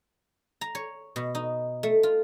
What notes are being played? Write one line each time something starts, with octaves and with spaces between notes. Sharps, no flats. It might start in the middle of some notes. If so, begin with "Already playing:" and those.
A#5
C#5
B2
D#4
A3
F4